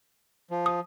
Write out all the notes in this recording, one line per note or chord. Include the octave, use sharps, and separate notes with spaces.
F3
D#6